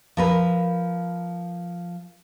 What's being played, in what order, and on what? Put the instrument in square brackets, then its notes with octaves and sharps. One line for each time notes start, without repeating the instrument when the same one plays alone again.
[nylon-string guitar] F3 A#4 B4